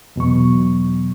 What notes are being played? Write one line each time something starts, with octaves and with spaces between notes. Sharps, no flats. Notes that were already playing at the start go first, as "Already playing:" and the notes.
E2 B2 F#3 C#6